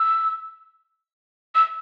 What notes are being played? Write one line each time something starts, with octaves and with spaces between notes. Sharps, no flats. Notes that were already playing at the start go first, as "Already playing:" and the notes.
Already playing: E6
E6